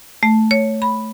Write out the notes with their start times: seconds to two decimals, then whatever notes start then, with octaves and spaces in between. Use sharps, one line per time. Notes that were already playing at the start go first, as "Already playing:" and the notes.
0.23 A3
0.51 C#5
0.82 B5